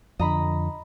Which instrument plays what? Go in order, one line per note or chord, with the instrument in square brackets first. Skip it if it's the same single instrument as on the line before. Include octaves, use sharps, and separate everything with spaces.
[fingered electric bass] F2 D3 [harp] D#5 A#5 B5